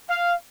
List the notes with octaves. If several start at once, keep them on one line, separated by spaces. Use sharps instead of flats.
F5